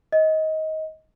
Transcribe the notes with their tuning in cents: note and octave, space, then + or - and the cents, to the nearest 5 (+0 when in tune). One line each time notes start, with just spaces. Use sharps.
D#5 +20